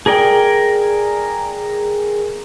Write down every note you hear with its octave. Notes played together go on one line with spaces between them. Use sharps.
G#4 A#4 D5 G5